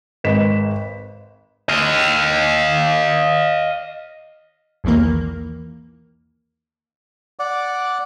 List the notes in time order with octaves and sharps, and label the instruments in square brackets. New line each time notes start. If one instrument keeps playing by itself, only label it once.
[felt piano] G#1 B4 D#5 B6 E7
[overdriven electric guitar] D#5 F5
[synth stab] B1 E2 D#3 E3 A#3
[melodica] D5 F#5 D6